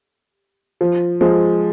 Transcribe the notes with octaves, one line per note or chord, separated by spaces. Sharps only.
F3
F3 G#3